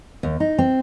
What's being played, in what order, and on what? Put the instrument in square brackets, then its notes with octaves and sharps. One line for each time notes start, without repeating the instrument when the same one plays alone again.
[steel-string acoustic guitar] D#2
D#4
C4